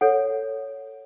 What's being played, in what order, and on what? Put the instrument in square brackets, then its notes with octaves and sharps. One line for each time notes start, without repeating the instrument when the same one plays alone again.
[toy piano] A4 C#5 F#5